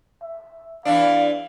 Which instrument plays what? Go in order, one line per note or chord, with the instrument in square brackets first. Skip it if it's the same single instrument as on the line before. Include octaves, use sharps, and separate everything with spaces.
[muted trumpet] E5
[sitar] E2 E3 D4 [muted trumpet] F5